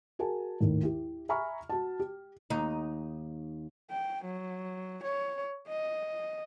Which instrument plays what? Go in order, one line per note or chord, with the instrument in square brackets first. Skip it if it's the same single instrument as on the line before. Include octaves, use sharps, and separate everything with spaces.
[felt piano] F#4 G#4 A#4 G#5 A5
D#2 A2 D#3
E4 G4
E5 G#5 A#5 B5 C#6 F6
F#4 A5
G4
[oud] D#2 D#4
[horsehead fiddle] G5
F#3
C#5
D#5